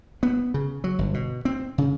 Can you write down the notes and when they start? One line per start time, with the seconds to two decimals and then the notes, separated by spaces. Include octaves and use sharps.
0.23 B3
0.54 C#3
0.84 F#3
0.99 G1
1.14 B2
1.45 C4
1.78 C#3